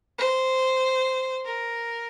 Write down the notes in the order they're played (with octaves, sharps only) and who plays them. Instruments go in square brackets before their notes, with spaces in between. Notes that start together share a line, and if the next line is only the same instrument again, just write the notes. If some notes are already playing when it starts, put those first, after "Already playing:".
[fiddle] C5
A#4